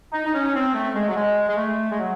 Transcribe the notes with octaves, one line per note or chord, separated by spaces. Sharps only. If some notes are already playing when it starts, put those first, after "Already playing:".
D#4
D#4
C#4
C4
A3
G#3
F#3
G#3
G#3
A3
G#3
F#3